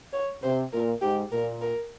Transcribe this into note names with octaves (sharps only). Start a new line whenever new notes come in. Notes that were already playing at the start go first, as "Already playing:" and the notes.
C#5
C3 C5
A#2 A#4
G#2 G4
A#2 A#4
A#4